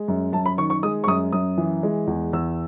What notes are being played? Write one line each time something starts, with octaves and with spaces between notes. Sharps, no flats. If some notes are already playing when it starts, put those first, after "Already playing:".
Already playing: G#3
F#2
F#2 A5
B5
D#3 C#6
C#6
G#3 D#6
C#6
F#2 D#6
F#2 D#6
E3
G#3
E2
E2 E6